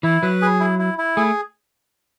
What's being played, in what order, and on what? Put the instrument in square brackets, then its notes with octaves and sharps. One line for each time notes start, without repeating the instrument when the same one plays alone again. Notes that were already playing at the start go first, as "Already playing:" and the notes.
[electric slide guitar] E3 [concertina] E4
[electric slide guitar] F#3 [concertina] B4
[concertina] G#4
E4
E4
E4
[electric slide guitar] A3 [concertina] G#4